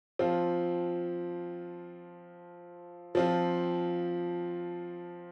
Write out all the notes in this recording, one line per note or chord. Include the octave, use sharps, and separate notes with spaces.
F3 C4 F4
F3 C4 F4